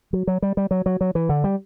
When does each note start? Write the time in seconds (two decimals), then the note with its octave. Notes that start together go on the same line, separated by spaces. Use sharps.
0.13 F#3
0.27 F#3
0.42 G3
0.57 G3
0.71 F#3
0.86 F#3
1.01 F#3
1.15 E3
1.29 D3
1.44 G3